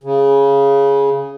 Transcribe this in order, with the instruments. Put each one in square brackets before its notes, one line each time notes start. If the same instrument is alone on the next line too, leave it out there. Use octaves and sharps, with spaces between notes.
[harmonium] C#3